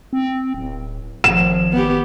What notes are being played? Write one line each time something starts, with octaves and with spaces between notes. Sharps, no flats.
C4
D1
G#1 F3 E7
B3 G4